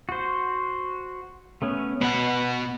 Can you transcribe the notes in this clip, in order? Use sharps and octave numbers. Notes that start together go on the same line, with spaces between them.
F#4 C5
A3 B3 C#4
B2 B4 F#5 B5